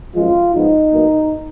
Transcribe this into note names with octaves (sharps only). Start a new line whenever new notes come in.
G#1 F#2 F3 G#3 F4
G#2 F3 B3 D#4
B1 B2 A#3